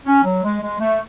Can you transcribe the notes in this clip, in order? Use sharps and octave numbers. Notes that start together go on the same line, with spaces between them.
C#4
F#3
G#3
G#3
A3